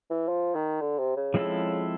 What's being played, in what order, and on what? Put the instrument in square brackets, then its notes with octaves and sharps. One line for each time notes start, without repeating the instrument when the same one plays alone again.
[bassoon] E3
F3
D#3
D3
C3
C#3
[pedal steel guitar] F3 G#3 C4 E4 A4